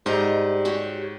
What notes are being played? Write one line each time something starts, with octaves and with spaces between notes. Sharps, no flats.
G#2 G3 C5 D#5 A#5
F#4 G4 C#5